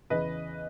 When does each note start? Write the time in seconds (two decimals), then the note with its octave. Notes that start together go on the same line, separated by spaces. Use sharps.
0.10 E2 C#3 E3 B4 D#5